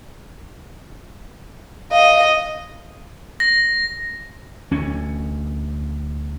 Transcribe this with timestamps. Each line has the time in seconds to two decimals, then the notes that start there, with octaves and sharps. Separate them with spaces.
1.92 D#5 F5
3.40 A#6
4.71 D2 C#4